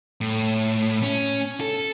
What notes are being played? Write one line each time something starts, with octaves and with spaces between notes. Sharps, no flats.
A2
C#4
A4